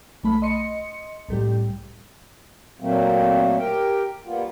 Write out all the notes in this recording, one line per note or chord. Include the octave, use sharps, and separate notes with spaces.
B1 A3 B5
D#5 C6 C#7
C2 A2 G3 G4
A#2 F#3 A3 A#3 C4
G4 A#4 G5
G3 A#3 B3 F4